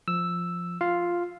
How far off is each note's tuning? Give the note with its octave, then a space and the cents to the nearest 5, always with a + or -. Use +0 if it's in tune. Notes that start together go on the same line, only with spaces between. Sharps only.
F3 +0 E6 +0
F4 +0 F5 +0